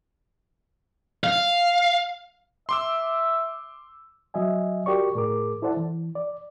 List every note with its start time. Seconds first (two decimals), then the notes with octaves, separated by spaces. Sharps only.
1.24 F5
2.69 E5 C6 D6 E6
4.34 F#3 D#5 E5 G#5
4.86 F#4 G4 A#4 D5 C#6
5.15 A2 G#4 A#4 D6
5.62 E4 A4 C5 D5 F#5 A5
5.77 E3
6.15 D5